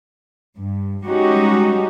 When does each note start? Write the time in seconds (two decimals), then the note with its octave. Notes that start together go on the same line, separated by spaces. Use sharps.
0.58 G2
1.06 G3 G#3 C#4 D#4 F#4 G4